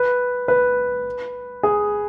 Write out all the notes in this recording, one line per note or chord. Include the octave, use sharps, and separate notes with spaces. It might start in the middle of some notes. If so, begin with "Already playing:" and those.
Already playing: B4
B4
G#4